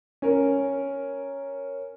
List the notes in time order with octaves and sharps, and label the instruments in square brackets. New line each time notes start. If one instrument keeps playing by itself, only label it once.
[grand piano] C#4 A#4